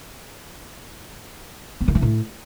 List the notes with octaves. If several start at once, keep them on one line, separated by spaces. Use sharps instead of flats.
B3
D#3
E3
A2